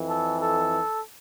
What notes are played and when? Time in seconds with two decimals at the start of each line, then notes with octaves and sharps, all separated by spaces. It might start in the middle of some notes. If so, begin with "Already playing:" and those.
Already playing: F2 E3
0.09 A4
0.41 A4